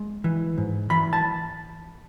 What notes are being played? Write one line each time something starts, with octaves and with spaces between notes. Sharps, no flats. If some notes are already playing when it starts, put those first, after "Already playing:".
Already playing: G#3
E3
G#2
E3 B5
A5